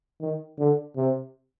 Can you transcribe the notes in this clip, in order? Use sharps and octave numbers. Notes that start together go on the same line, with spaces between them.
D#3
D3
C3